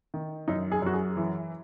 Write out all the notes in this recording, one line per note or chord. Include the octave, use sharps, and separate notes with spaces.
D#3
F#2 D#4
G#4
F#2 F#4
G#4
E3